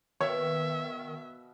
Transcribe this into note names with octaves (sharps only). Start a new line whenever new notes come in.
B2 D#3 C#5 E5 F5